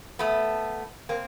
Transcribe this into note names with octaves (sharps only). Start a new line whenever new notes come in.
A3 B3
A#3 C4